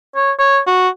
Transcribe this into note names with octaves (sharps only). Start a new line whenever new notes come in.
C#5
C#5
F#4